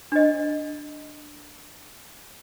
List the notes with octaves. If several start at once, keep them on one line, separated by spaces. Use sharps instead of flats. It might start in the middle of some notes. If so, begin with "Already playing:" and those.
D4 D#5